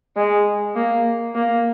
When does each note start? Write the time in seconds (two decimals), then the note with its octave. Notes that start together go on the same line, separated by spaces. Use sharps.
0.16 G#3
0.75 A#3
1.35 A#3